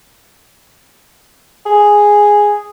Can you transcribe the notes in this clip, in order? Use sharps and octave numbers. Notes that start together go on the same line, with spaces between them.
G#4